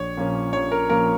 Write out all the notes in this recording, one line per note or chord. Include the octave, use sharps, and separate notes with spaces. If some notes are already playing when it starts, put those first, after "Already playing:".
Already playing: A#1 C#5
A#2 F3 A#3 C#4
A#1 C#5
A#4
A#2 F3 A#3 C#4 A#4